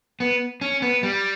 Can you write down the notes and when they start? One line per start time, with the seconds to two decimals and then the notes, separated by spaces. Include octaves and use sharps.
0.20 B3
0.61 C#4
0.82 B3
1.03 G3